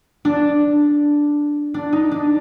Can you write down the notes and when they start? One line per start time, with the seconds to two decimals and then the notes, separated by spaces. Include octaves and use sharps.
0.25 D4
1.74 D4
1.93 D#4
2.11 D4